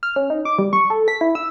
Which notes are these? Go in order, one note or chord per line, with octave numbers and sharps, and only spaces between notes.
F6
C#4
D#4
D6
G3
C#6
A4
B6
E4
E6